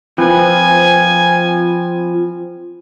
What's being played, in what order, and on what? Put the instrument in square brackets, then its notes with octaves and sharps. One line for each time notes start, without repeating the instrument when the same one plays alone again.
[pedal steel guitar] F3 C4 B4 [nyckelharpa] G#5